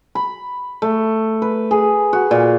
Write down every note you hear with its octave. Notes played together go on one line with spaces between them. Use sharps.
B5
A3
B4
G#4
F#4
A#2